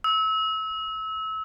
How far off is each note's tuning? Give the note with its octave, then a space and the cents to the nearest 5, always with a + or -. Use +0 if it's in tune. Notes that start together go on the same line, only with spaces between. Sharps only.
E6 -30